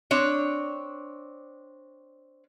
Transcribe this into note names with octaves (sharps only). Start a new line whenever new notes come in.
C4 D4 C#5